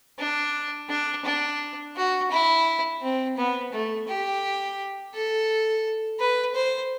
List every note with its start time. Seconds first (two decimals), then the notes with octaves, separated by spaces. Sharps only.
0.19 D4
0.89 D4
1.25 D4
1.96 F#4
2.30 E4
3.02 C4
3.37 B3
3.72 A3
4.08 G4
5.14 A4
6.19 B4
6.55 C5